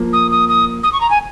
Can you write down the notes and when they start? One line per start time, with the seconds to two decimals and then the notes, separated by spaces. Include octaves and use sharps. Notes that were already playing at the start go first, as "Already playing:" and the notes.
Already playing: F3 A#3
0.13 D#6
0.31 D#6
0.49 D#6
0.83 D#6
0.93 C#6
1.01 A#5
1.10 G#5